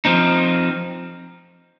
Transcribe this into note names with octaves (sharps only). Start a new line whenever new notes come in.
F3 C4 D#4